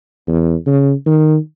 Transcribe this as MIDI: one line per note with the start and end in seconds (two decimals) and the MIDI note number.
0.27 0.55 40
0.67 0.93 49
1.06 1.36 51